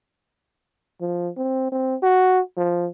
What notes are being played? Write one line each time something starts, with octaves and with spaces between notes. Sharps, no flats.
F3
C4
C4
F#4
F3